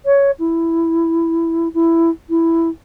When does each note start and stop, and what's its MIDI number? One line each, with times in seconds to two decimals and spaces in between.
0.06 0.31 73
0.39 1.68 64
1.74 2.10 64
2.30 2.69 64